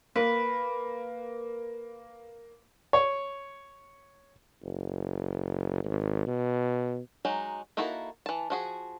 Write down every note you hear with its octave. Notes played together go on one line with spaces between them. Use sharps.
A#3 B4
C#5
F#1
G#1
B2
F#3 G#3 D#4
A#3 D#4 E4 F#4 A4
E3 A5
F3 F#4 G#4